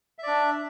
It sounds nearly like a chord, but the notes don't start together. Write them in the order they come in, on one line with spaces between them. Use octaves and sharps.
E5 D5 D4